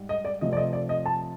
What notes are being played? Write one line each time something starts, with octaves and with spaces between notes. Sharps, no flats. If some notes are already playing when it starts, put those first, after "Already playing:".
Already playing: G#2 G3
D#5
D5
C3 F3 A3 C4 D#5
D5
D#5
D5
D#5
A5